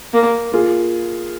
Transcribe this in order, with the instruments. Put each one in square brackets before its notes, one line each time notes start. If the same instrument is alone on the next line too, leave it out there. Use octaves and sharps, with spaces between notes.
[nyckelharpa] A#3
[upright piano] A#3 F4 G#4